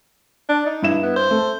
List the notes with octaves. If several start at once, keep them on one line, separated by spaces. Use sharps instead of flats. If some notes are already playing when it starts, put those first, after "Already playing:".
D4
D#4
G2 E4 E7
B3
C5
A3